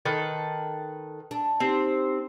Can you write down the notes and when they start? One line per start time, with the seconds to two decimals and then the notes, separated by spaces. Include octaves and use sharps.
0.05 D#3 A4 B4
1.31 D4
1.60 C4 D#4 G4